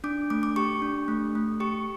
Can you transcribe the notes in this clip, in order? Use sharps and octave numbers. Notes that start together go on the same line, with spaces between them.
D4 D6
A3 D6
D6
G4 C#6
D4
A3
A3
G4 C#6